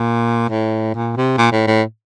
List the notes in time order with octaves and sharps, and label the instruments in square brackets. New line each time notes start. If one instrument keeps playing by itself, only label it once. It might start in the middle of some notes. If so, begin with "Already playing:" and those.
Already playing: [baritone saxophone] A#2
A2
A#2
C3
A#2
A2
A2